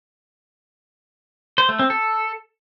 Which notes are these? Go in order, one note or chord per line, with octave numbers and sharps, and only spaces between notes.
C5
A3
C4
A4